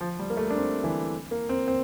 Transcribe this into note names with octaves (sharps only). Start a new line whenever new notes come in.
F3
G3
A#3
A3
D4
C4
E3
A#3
C4
C4